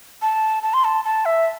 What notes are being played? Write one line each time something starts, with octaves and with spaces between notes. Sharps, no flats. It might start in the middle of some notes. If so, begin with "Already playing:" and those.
A5
A5
C6
A5
A5
E5